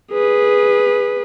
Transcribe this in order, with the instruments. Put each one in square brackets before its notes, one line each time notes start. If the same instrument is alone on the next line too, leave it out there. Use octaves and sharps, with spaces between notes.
[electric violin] G#4 B4